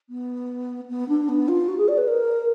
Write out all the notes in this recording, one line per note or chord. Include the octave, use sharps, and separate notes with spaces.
B3
B3
D4
B3
F4
F#4
G#4
D5
B4
A#4